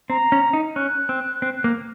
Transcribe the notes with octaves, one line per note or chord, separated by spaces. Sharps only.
C4 A#5
C#4
D#4
C#4 F#6
C4
C4
A#3